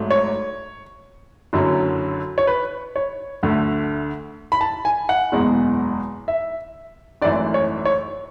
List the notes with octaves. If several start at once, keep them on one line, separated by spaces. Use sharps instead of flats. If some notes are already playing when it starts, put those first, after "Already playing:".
Already playing: G#1 G#2 F#3 A3
C#5
F#1 F#2 D3 F#3
C#5
B4
C#5
D2 D3 A3
B5
A5
G#5
F#5
F#1 E2 B2 G#3
E5
G#1 F#2 E3 A3 D5
C#5
C#5